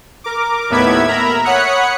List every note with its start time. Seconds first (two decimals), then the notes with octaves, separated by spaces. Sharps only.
0.24 A#4 D6
0.70 D#2 A2 B3 E5 B5 G#6
1.08 A#4 E5 A#5 B5
1.45 C#5 F#5 B5 D#6 F#6 C#7